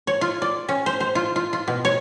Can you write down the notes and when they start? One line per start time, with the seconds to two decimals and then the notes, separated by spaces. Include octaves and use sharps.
0.07 C#5
0.21 F4
0.42 D5
0.69 C#4
0.86 C5
1.00 C5
1.15 F4
1.36 F4
1.53 F4
1.68 B2
1.85 C#5